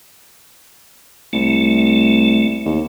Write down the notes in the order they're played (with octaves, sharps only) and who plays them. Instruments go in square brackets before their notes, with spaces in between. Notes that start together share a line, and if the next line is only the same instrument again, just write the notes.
[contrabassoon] C2 [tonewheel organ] A3
[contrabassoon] D#2